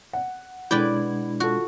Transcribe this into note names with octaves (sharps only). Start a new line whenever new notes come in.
F#5
B2 G#3 D4 E4 B4 D5 G5
F4 F#4 A4